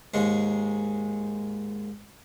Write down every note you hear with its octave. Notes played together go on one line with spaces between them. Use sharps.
D#2 G#2 G#3